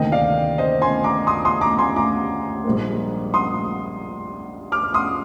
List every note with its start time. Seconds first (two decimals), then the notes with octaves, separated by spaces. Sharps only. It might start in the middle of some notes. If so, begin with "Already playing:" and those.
Already playing: D2 C3 D#3 A#3 D#5 G5
0.12 D5 F5
0.58 C5 D#5
0.82 G#5 C6
1.04 A#5 D6
1.27 C6 D#6
1.45 C6 D#6
1.61 A#5 D6
1.78 G#5 C6
1.96 A#5 D6
2.64 A#1 G#2 G3 A#3
3.34 C6 D#6
4.72 D6 F6
4.94 C6 D#6